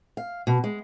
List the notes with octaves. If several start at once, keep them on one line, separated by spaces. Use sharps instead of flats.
F5
B2
G#3